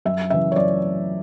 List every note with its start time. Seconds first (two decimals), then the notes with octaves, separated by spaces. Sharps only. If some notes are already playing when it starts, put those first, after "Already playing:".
0.05 F#2 E5
0.30 C#3 E5
0.34 E3
0.52 C#5
0.56 F#2 D5